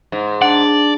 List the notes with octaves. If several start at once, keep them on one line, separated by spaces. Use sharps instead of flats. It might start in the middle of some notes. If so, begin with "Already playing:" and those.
G#2
D4 D5 F#5 A5